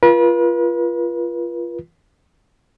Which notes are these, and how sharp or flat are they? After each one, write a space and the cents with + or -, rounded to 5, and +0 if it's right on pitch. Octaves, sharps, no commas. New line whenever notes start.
F4 -20 B4 -40